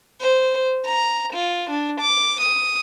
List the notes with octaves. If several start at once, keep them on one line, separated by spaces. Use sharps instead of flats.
C5
A#5
F4
D4
D6
D#6